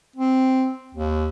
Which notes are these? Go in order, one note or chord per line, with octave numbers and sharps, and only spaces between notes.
C4
D#2